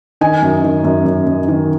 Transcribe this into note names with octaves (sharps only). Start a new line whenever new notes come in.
D#3 D#5 G#5
F#2
D#3
F#2
F#2
F#2
D#3